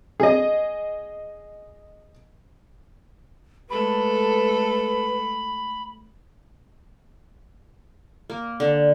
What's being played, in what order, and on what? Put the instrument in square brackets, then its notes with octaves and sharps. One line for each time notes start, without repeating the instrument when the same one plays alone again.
[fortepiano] G#4 D#5
[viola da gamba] G#3 A3 A4 [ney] B4 [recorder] B5
[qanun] A#3
D3